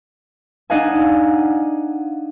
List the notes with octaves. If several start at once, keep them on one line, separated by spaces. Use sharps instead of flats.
D4 D#4 D#5 F5 F#5 G#5